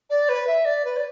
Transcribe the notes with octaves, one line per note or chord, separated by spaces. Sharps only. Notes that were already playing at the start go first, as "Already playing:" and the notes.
D5
B4
E5
D5
B4
D5